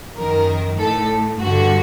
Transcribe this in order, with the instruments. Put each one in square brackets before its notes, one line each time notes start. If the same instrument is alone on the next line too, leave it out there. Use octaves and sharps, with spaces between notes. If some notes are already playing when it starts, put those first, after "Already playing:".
[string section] F#2 D#3 A#4
A2 A4
G2 D3 F#4